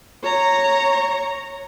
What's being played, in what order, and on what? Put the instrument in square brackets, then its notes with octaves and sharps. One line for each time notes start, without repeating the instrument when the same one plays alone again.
[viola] C#5 A#5